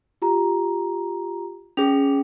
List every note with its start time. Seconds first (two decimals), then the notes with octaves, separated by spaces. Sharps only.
0.22 F4 G4 A#5
1.77 C#4 G#4 F7